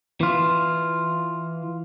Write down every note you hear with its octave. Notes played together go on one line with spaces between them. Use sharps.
E3 F4